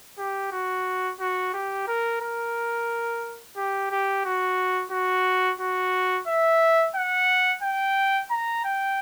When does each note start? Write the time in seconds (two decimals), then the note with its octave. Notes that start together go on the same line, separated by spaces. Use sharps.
0.18 G4
0.52 F#4
1.20 F#4
1.54 G4
1.88 A#4
2.21 A#4
3.57 G4
3.91 G4
4.25 F#4
4.92 F#4
5.60 F#4
6.28 E5
6.96 F#5
7.63 G5
8.30 A#5
8.64 G5